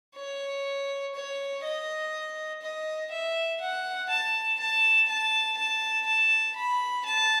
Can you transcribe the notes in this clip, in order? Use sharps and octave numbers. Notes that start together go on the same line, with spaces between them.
C#5
C#5
D#5
D#5
E5
F#5
A5
A5
A5
A5
A5
B5
A5